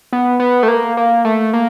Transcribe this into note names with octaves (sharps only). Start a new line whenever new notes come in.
B3
B3
A3
A#3
A#3
A3
A#3